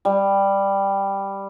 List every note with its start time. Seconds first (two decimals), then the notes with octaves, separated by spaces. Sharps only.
0.05 G3